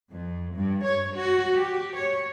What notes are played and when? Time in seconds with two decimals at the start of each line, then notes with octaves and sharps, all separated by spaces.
0.12 F2
0.54 G2
0.83 C#5
1.15 F#4
1.56 G4
1.96 C#5